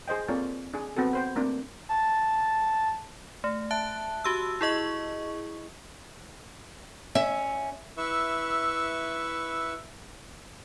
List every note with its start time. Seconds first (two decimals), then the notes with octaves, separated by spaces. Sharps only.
0.08 G#4 C5 D#5 G5
0.28 A#3 C4 F4 A4 C#5 D5
0.74 D4 G#4
0.97 B3 C4 F#4 A4
1.13 B4 C5 G5
1.36 A3 A#3 C4 D4
1.89 A5
3.44 A3
3.71 E5 A5 F#6
4.24 F#4 G4 E6
4.61 E4 G#4 D#5 C#6
7.15 C#4 E5
7.97 E4 B4 E5 C#6 E6